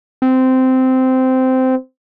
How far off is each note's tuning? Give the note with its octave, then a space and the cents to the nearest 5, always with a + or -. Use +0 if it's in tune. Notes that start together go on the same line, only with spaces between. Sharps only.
C4 -15